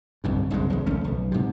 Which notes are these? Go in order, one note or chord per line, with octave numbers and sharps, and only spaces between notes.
G1 C2 G2
F#1 C2 G2 G#3
F1 D#2 G#3
G#1 F3 A3 C#4
B1
G#2 C3